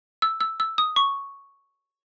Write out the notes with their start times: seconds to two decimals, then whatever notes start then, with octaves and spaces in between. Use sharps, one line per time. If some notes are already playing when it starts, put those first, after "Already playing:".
0.22 E6
0.40 E6
0.60 E6
0.78 D#6
0.96 C#6